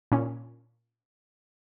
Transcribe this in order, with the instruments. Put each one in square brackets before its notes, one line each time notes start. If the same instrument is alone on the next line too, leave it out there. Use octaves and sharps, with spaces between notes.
[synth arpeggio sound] A#2 C#4